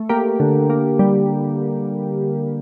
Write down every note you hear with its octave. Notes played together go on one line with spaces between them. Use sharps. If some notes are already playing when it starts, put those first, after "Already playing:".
Already playing: A3
A#3 G4 A#4
D3
A#3
G3